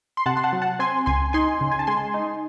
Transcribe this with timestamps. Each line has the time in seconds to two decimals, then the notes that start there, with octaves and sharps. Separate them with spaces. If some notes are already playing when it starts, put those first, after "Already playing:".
0.17 C6
0.26 C3 F#5 A5
0.37 C6
0.44 F#5 A5
0.53 F#3
0.62 F#5 A5
0.79 C4 G#5 C6
1.06 C#2 G#5 C6
1.33 D#4 G#5 C6
1.61 C#3
1.71 G#5
1.79 A5
1.87 G#3 G#5 C6
2.14 D#4